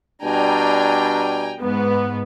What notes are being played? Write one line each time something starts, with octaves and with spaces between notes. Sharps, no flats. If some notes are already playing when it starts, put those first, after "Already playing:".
B2 G3 D4 G5 G#5 A#5
G#2 B3